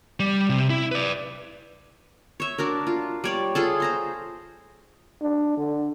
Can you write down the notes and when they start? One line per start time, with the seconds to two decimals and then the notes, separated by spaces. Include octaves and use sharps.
0.20 G3
0.50 C3
0.70 E4
0.92 B4 D5
2.40 C#5 E5
2.58 D4 F#4 A#4
2.87 F4
3.24 G3 C#5 D5
3.55 F4 G#4 A4
3.80 C5 A#5 C6
5.21 D4
5.57 D3